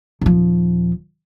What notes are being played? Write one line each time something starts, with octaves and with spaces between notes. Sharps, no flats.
D#1 F3